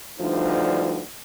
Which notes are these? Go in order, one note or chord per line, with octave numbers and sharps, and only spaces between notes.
D2 G2 F3 D#4